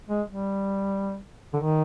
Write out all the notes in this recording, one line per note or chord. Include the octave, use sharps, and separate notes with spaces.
G#3
G3
D3
D#3